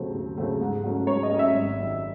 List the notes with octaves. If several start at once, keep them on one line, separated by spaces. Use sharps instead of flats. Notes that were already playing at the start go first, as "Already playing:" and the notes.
Already playing: D#2 C#3 F#3 A3 C4
D#2
C#3 F#3 A3 C4
G#2
F#3 A3 C#4
G#2 C#5
D#5
F#3 A3 C#4
E5
G#1
F#2 D#3